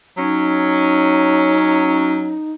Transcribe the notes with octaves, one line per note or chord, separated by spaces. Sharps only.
F#3 C#4 D#4